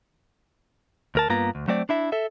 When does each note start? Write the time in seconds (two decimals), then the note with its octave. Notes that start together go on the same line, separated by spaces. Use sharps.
1.15 D2 A#4 A5
1.29 G2 A#3 B3 F4 A#5
1.55 D2
1.68 F#3 A3 C4 D5
1.89 D4 E4 E5
2.12 A4 E5